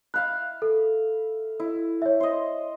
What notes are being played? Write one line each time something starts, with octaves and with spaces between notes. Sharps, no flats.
E5 F5 B5 F#6
A4
E4
C#5 E5
C5 D#5